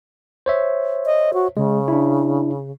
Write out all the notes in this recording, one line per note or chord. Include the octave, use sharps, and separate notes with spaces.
C5 C#5 E5
D#5
F#4
C#3 G#3
D4 E4